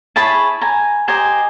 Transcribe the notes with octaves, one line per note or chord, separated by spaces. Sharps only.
E4 G#4 C#5 A5 B5
G#5 A#5
G4 C5 D#5 G#5 A#5